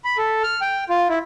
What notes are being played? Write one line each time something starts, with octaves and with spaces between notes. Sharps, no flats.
B5
A4
F6
G5
F4
E4